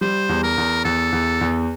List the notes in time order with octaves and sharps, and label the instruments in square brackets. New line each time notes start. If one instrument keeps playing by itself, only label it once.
[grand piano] G3 [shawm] C5
[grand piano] E2
[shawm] A#4
[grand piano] E2
[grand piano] E2 [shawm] A4
[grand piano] E2
E2